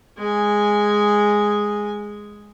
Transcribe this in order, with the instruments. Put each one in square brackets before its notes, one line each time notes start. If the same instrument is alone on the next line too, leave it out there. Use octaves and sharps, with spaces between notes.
[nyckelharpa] G#3 G#5